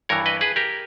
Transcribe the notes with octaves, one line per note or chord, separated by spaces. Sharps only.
G2 E3 A#4 C#5
B4 D#5
G#4 B4
G4 A#4